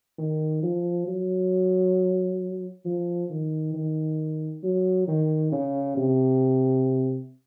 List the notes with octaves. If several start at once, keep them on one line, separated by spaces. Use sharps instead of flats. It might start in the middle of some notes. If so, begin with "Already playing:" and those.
D#3
F3
F#3
F3
D#3
D#3
F#3
D#3
C#3
C3